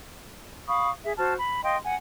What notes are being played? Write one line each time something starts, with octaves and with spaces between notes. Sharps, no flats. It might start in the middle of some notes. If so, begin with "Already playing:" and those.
F5 B5 C#6 D#6
G#4 E5
F#4 C5 A5 F6
B5
D#5 F5 G5 C6
F#5 G#5